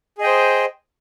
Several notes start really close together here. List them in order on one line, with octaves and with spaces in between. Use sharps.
G#4 D#5 G5 C5